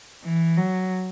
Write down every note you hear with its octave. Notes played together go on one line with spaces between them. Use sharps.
E3
F#3